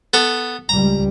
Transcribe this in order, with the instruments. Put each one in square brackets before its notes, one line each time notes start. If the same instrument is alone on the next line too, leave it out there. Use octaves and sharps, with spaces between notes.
[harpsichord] B3 A4 C#6
[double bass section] C#2 G3 [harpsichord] A#5